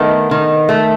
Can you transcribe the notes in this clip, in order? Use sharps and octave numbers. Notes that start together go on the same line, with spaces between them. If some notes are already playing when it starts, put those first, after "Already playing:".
Already playing: D#3 A3 B3
D#3
A3